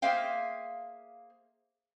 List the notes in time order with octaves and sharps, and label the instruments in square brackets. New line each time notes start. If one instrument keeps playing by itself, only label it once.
[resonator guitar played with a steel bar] A#3 G#4 C5 E5 F5 G5